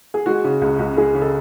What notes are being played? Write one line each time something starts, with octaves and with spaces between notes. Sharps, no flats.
G#4
G#3 F#4
C#3
C#2
C#2
G#3 G#4
C#3
A4